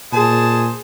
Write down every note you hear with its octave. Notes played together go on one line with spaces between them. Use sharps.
A#2 G#4 C5 A5